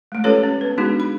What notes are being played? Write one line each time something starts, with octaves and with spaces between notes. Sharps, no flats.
G#3 A3
C#4 F4 G4 A4 B4 C#5
C#4
B3 B4
G#3 B3 D4 D#4 F#4 G#4
B5